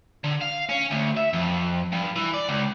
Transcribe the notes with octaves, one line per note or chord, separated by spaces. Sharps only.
D3
F5
C#4
D2
E5
F2
G2
E3
D5
C#2